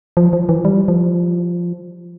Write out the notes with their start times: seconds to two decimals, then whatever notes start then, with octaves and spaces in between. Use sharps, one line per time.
0.17 F3
0.33 F3
0.49 E3
0.65 G3
0.88 F3